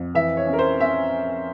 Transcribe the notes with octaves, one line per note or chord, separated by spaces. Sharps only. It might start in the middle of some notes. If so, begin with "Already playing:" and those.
Already playing: F2
E3 E5
C#5
C#4
A#4
C5
C#4 E5